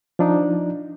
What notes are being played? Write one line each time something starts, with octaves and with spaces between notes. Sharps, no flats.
F3 D4 D#4